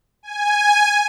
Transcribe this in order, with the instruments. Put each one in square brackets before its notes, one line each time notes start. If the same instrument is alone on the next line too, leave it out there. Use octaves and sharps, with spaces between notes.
[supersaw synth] G#5